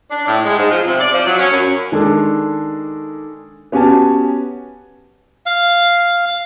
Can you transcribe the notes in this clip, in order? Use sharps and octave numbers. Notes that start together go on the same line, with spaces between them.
D4
A2
G#3
G#2
F3
C3
D5
F3
F#3
C#4
F#2
D#3 G#3 D4 A4
B3 C#4 F#4 G4 G#5 A5
F5